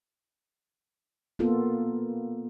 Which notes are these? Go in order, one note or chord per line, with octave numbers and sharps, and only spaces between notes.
A#3 B3 F4 A4